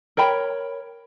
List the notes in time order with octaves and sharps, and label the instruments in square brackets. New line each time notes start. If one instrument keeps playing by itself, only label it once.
[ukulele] A#4 C#5 G5 B5